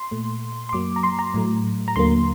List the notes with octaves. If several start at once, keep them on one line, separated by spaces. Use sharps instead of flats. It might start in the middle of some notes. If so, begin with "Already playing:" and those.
Already playing: C6
A#2 A3
C6
F#2 F#3 A#3 D6
A#5
C6
A#5
A2 F#3 A3
A#5
D#2 D3 F#3 A#3 C6